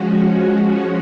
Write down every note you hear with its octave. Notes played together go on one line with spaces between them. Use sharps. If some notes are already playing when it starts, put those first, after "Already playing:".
Already playing: F3 G#3 C#4 F#4